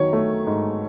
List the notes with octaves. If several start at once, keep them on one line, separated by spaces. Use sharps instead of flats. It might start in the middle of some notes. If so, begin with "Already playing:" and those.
Already playing: D#3 F#3 C#5
A3
G#2